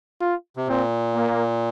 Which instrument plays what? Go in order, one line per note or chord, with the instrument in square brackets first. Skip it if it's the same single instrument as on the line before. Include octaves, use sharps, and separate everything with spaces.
[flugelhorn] F4
[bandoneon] C3
[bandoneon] A#2 [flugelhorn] C4
[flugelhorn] A#3